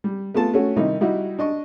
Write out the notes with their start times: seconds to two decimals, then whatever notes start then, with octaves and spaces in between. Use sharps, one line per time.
0.04 G3
0.35 A3 B3 F4 A5
0.54 A3 C#4 F#4
0.76 C3 D#3 G3 D#4 E4
1.01 G3 D#4 E4 F#4
1.39 D4 D#5 C#6